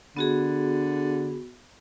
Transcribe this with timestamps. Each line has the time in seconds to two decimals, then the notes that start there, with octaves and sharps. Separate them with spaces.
0.17 D3 B3 F#4 G#4